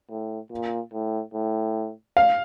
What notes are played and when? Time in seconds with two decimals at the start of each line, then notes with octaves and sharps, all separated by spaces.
0.10 A2
0.51 A#2
0.92 A2
1.34 A2
2.17 F5